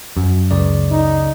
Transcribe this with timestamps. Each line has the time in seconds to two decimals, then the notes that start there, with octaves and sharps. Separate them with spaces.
0.17 F#2
0.51 C#2 C#3 D5
0.91 D#4